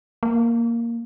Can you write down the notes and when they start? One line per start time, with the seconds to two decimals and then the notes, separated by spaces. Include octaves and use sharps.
0.23 A#3